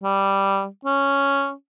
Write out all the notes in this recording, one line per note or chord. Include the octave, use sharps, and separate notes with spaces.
G3
C#4